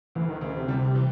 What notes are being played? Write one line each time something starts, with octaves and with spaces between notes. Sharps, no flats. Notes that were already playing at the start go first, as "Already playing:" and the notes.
D2 E3
D#3
D2 C#3
C3
C3 G3
E3